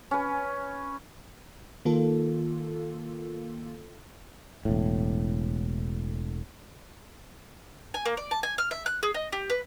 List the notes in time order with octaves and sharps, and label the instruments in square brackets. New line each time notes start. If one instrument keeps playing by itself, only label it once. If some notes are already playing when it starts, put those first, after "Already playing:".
[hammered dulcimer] C#4 B4
[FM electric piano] D#3 A#3 F4 A4
[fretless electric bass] E1 A2
[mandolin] G#5
A#3
D5
A5
G#5
F6
E5
F#6
G#4
D#5
G4
B4